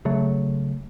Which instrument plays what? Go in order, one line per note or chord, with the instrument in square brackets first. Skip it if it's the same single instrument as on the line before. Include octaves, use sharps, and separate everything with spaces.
[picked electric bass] C#3 F#3 A3